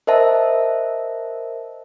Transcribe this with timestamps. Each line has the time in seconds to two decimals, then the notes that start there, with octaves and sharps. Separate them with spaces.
0.07 A#4 C5 D#5 E5 A5